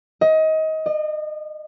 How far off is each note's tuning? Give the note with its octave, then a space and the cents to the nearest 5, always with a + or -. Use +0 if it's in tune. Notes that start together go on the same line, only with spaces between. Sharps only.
D#5 +25
D#5 -35